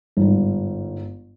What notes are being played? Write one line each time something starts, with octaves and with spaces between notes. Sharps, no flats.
G1 G#2